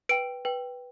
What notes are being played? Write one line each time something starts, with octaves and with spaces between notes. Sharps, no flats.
B4 G5 D7
B4 G5